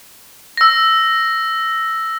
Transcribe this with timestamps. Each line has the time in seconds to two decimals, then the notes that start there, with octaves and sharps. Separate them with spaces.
0.57 E6 A#6